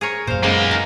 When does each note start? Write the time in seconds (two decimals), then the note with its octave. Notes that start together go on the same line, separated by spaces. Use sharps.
0.01 G#4 A#4 C#5
0.27 F#2 A#2 C5 F5
0.43 C#3 G#3 A#3 B3 D#4
0.71 A#4